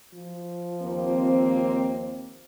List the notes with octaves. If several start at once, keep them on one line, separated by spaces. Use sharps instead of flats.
F3
D#2 A#3 C4